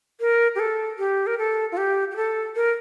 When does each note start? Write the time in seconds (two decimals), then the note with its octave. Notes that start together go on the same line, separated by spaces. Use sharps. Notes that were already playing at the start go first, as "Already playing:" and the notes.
0.21 A#4
0.55 G4
0.59 A4
0.99 G4
1.27 A#4
1.38 A4
1.72 F4
1.77 G4
2.11 G4
2.16 A4
2.56 A#4